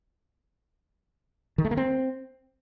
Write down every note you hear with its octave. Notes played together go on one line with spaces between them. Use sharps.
D#3
A3
A#3
C4